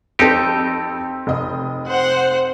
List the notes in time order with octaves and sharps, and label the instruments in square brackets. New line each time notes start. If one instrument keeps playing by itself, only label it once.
[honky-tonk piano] F2 A4 [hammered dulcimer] C4 [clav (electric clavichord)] D#4 G4
[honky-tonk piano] F1 D#5 D#6
[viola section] C5 F#5